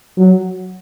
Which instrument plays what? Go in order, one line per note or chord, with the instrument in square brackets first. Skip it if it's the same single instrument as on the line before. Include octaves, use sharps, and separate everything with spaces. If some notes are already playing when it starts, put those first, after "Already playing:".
[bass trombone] F#3